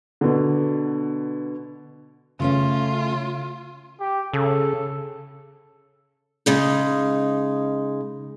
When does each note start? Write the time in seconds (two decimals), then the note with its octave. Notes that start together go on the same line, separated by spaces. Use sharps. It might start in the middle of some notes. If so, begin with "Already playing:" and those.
0.21 B2 D3
2.40 C#3 A3 C#4 F4
4.00 G4
4.33 C#3 A4
6.46 C#3 G#3 D#4